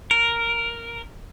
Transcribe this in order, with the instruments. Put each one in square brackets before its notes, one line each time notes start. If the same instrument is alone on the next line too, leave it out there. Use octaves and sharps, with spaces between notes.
[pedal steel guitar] A#4